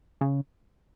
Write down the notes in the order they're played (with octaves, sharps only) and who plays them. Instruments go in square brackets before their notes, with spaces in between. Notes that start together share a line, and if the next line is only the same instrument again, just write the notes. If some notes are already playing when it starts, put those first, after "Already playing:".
[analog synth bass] C#3